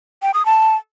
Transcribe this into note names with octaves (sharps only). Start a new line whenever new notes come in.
G5
D#6
A5